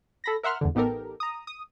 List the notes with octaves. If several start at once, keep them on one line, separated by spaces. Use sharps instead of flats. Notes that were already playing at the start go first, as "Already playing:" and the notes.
A4 B5 A#6
A#4 E5 F#5 C6 F6
E2 G2 D3
A1 B3 D#4 G4 A4 A#4
A#5 D#6
D#6